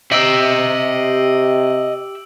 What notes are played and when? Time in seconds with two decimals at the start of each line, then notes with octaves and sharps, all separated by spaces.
0.12 C3 G4 D#5 E5 E6 D7 F#7